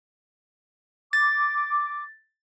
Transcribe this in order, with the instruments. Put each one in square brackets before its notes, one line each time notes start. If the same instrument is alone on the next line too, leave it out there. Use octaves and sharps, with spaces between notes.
[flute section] D6 [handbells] A6